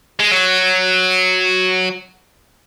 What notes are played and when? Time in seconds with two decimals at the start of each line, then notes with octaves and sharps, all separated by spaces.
0.20 G#3
0.32 F#3